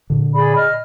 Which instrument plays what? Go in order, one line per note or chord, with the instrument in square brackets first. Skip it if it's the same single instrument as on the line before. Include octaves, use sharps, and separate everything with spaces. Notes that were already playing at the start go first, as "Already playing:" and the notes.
[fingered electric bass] A#2 D3
[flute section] G#4 D5 B5
D#5 F6